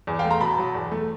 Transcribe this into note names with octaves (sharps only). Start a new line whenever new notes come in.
E2
F5 G5
A3
A#5 C6
B2 A5 B5
F#3
E2
A3